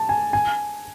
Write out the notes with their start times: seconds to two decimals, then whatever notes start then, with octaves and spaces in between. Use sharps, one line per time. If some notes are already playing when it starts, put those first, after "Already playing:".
Already playing: A5
0.09 G#5
0.33 G#5